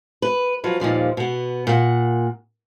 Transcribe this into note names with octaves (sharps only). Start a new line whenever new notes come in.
B4
F3 F#3 B4
D#2 A#2 F3 G3
B2 B3
A#2 F#5